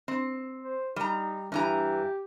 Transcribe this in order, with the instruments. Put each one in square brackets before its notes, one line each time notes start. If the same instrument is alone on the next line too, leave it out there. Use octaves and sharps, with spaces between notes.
[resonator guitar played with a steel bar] C4
[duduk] C5
[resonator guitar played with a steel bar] G3 A#5 [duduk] D#4
[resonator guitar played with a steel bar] G2 E3 A#5 [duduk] G4